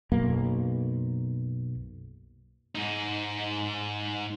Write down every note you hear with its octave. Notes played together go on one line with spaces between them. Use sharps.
B1 F#2 A#3
G#2 D#4